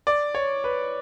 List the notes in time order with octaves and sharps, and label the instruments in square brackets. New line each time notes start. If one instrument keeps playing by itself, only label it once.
[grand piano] D5
C#5
B4